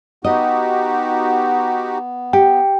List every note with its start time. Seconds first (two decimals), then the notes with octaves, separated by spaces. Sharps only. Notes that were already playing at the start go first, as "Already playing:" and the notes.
0.24 B3 D#4 F#4 G4 D#5
2.33 G4 G5